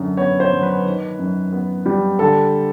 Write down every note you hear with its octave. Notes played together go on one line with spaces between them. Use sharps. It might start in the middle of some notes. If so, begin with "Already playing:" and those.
Already playing: F#2 D3
B3 C#5
C5
F#3
B4
D#3
F#2
B3
G3
D3 A4